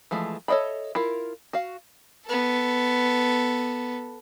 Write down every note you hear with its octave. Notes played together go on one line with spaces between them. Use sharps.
E3 F3 G#3 A3
A4 C#5 D#5 E5 B5
E4 F4 A#4
F#4 F5
B3 A4